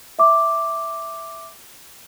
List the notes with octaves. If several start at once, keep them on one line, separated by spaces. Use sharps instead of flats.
E5 D6